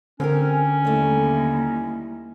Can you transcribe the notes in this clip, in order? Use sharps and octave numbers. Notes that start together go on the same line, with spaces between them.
D3 C4 C#4 G4 A#4
D#2 G3 A3 E4